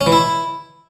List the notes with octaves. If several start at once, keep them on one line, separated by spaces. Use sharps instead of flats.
C#4
E3
E4